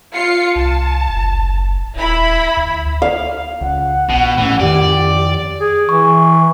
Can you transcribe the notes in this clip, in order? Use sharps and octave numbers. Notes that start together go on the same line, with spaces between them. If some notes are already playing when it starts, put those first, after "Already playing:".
F4 C7 C#7
C2 A5
F#1
D#1 E4 E5 B5
D2
F5
C#2 F#5
A#1 B2
A2 E3 C#4
F2 D#3 G4 D5
G#4
E3 C#6